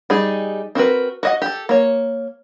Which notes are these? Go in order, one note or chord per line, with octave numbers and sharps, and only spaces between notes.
G3 D#4 G#4
C4 F#4 A#4 B4
F#4 D#5 F#5
G4 A4
A#3 C#5